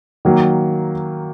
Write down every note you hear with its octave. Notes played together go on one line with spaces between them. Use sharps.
D#3 F#3 A#3